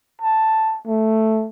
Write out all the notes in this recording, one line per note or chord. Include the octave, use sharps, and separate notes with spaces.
A5
A3